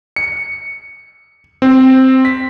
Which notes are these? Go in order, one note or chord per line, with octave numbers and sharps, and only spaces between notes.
C#7
C4
B6